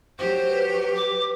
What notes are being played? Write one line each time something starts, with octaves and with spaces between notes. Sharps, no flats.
F#3 G4 C5
B4
D6